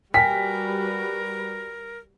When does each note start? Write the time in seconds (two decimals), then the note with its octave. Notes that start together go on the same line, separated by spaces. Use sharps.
0.14 G3 F#4 A#4 B4 G5 G#5 B6